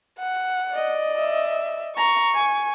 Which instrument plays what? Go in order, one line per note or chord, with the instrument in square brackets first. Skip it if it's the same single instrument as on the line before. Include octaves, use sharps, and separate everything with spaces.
[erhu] F#5
[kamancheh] D5 D#5
[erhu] E5
[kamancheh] A#5 [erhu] C#6
[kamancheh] G#5